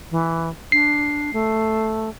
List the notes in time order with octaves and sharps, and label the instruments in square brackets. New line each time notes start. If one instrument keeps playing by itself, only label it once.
[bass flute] E3
[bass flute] D4 [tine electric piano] C7
[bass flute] A3